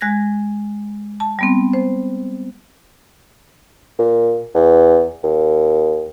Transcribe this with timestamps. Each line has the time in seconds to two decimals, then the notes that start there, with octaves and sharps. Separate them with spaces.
0.01 G#3 F#6 G#6 A#6
1.20 A5
1.39 G3 B3 C4
1.73 C5
3.99 A#2
4.55 E2
5.24 D#2